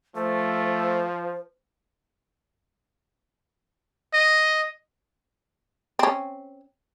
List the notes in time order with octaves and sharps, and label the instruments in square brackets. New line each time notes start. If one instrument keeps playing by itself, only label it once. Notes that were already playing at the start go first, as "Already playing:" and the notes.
[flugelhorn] F3 [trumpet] A3 [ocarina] C5
[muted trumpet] D#5
[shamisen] C4 C#4